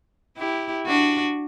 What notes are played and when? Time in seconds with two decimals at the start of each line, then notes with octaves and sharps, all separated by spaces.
0.37 E4 G4
0.87 D4 F#4